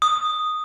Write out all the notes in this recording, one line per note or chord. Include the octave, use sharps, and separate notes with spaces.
D#6